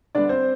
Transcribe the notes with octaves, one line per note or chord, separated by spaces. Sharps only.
D3 G3 B3 D4 D5
C4 C5